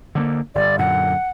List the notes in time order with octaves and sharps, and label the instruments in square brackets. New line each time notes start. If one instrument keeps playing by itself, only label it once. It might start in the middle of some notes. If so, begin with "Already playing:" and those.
[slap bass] D3 A3 A#3
[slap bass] G1 [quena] D5
[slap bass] F#2 A#2 D3 [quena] F#5